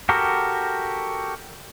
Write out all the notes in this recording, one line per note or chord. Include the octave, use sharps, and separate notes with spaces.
F#4 G4 A4 A#4